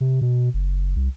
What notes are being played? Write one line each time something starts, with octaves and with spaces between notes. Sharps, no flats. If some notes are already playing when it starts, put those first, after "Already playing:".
C3
B2
F#1
C2